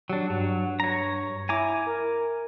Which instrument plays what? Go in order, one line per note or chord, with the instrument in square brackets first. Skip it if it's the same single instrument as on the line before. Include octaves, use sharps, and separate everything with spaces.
[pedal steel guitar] F#3 D4 [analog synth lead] G4
[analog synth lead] G2 [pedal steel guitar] F#3
[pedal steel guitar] C#5 A#5
[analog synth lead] E4 [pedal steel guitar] G#5 A#5 D6
[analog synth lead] A#4